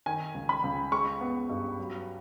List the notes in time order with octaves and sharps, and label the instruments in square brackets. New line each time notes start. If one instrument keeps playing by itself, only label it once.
[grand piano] D#3 G#5
C#2
B5
C#2
G#3 C#6
B3
G2
F#3